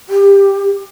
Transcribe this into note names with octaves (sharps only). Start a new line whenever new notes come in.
G4